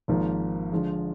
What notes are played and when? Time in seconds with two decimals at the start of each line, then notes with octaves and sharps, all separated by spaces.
0.08 G#1 G#2 F3 A#3
0.72 D3 F3 G#3